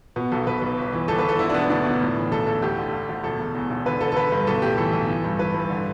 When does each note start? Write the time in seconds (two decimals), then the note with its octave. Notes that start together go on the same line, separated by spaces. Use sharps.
0.16 B2 B3
0.32 B1 A4
0.47 B1 B4
0.62 B1
0.77 G1
0.93 E3
1.08 G1 A4
1.19 B4
1.24 G1 A4
1.39 D3 E4
1.49 D4
1.54 E1 B3
1.70 D2 D4
1.86 E1
2.01 A2
2.16 E3
2.32 B1 A4
2.47 B1 A4
2.62 D2 G4
2.78 D3
2.93 D3
3.09 D2
3.24 E1 A4
3.39 E1
3.55 E2
3.70 E1
3.86 D3 B4
4.01 D3 A4
4.12 A4
4.16 D3 B4
4.32 G2
4.47 B1 A4
4.62 A2 G4
4.78 E3 A4
4.93 B1
5.08 E3
5.24 G2
5.39 E3 B4
5.54 G2
5.70 D3